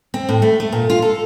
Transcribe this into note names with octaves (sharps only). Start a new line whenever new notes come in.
C4
A2
A3
A3
A#2
F4
A4